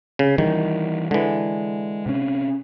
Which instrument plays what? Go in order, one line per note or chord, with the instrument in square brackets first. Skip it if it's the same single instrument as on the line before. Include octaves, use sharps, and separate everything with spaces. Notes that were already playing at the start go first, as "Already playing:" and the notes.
[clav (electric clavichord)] C#3
[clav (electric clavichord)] D#3 [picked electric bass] E3 G3
[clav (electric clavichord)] D3 E3 [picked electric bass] G#3
[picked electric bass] C3 C#4